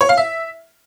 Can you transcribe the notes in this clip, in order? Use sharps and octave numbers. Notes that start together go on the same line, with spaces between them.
C#5
F5
E5